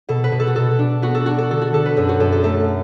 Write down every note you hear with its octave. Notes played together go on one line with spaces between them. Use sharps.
B2 A4
B4
B2
A4
F#4
B2 A4
D4
B3 F#4
A4
D4 F#4
A4
D3 A4
F#4
D3 A4
B4
F#2 A4
F#4
F#2 A4
A4
A3 A4